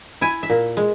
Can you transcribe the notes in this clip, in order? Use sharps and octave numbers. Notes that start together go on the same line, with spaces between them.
E4 G#5
E5
A#2
G#3